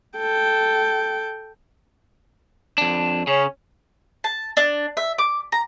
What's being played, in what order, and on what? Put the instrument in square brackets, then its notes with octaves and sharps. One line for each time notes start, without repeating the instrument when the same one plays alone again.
[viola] A4 G5
[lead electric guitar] F2 D4
[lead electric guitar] C#3 [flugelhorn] C#4
[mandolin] A5
D4
E5
D6
A#5